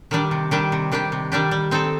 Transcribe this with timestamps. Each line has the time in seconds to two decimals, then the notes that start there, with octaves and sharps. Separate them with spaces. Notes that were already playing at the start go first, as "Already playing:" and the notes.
0.11 D#3 G3 D4 G4
0.31 C3
0.51 D#3 G3 D4 G4
0.72 C3
0.92 D#3 G3 D4 G4
1.12 C3
1.32 D#3 G3 D4 G4
1.51 G3
1.71 C4 D#4 A4